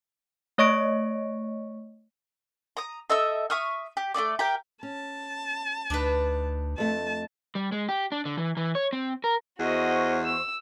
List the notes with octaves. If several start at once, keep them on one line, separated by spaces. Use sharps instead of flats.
A3 C#5 D#5 C#6 A#6 D7
A#5 D#6
A4 D#5 E5 E6
E5 C#6 D#6 F6
G4
A3 E4 D5 D6
G4 A#4 G5
C#4 A5
D2 D4 D#4 B4
F2 A3 A5
G3
G#3
G4
D4
D3
E3
E3
C#5
C4
A#4
E2 F#4 C5 D#5 C#6
E6